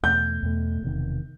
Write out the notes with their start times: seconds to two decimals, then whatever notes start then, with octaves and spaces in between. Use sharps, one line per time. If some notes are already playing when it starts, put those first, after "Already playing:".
0.03 E2 B2 A3 G6
0.43 E2 B2 A3
0.82 E1 E2 C3 D#3